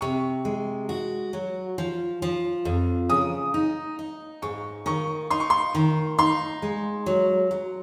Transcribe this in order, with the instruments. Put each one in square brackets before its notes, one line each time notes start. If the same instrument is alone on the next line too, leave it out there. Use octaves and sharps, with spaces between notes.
[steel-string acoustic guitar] C3 [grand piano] C#6
[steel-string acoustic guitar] G#3
F#4
F#3
F3
F3
F2
[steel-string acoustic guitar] C#3 [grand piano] D#6
[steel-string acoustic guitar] D#4
D#4
[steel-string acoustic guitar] G#2 [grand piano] C#6
[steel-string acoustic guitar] D#3 [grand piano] C#6
[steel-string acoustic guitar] D#4 [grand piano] C6
[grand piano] C#6
C6
[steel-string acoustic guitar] D#3
[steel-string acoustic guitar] D#4 [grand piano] C6
[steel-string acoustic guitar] G#3
F#3
F#3